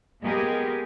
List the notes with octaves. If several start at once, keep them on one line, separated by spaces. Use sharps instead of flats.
G#3 A#3 B3 G4 G#4 A#4